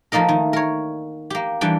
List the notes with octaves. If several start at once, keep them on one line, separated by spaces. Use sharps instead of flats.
F3 A3 A#3 D#4 A#4
D#3
A#4 C#5
A#3 G4
E3 G3 D4 G5